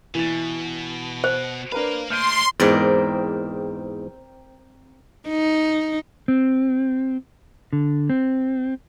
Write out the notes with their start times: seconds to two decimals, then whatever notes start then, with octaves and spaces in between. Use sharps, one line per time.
0.15 B2 E3 A6
1.24 C5
1.72 A#3 D4 A#4 B4 F5
2.10 A3 D5 C6 F6 G6 D#7
2.60 E2 G#2 C4 A#4 D5
5.28 D#4
6.28 C4
7.73 D3
8.10 C4